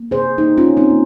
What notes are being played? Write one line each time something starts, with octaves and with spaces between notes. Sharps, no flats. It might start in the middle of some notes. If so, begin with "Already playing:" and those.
Already playing: A#3
C3 G#4 C5
A#3 D#4 G4
C#4 F4
C3
C4 D#4
A#3